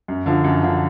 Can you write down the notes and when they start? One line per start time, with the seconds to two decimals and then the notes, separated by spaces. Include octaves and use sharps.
0.08 F#2
0.26 D3 F3
0.44 F#2
0.62 D3 F3